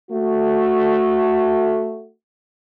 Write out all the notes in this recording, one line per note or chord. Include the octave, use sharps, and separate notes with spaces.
A3 F#4